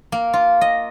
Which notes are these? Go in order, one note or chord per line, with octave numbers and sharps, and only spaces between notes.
A#3
F4
D#5